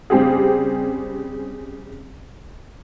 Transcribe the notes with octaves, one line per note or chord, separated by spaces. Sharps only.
C#3 G3 C4 G4 G#4